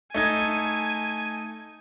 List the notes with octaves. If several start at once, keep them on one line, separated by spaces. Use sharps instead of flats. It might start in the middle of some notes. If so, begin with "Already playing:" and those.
A3 D#4 G#5 G#6